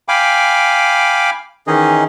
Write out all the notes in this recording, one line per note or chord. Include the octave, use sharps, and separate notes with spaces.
F5 G5 G#5 B5 D6
D#3 E3 C#4 D#4 G#4 D#5